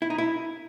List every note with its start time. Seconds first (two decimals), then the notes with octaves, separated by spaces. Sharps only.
0.02 E4
0.10 D#4
0.18 E4